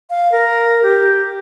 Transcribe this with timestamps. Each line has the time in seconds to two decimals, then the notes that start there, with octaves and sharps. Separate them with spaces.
0.10 F5
0.32 A#4
0.83 G4